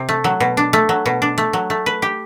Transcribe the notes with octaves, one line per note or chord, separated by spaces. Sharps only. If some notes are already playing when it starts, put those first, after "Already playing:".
Already playing: C3
A3
F#3
B2
D4
A3
F#3
B2
D4
A3
F#3
A3
B4
G4